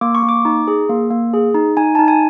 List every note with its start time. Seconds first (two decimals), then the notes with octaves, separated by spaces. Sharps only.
0.01 A#3 D6
0.15 C#6
0.23 A#3
0.29 D6
0.45 D#4
0.68 G#4
0.89 A#3
1.11 A#3
1.33 G#4
1.54 D#4
1.77 D#4 G#5
1.95 D#4 A5
2.08 G#5